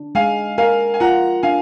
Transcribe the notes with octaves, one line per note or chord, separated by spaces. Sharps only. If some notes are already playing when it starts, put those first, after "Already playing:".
Already playing: D4
G#3 F5 G#5
A#4 F5 G#5
G#5
F4 F#5 A#5
D4 F5 G#5